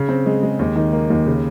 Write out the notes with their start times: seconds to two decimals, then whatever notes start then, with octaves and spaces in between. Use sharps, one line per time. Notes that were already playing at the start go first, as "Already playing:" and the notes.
Already playing: C#3
0.09 C4
0.26 G#3
0.43 G#3
0.59 D#2
0.76 D#3
0.93 A#3
1.10 D#2
1.27 C#3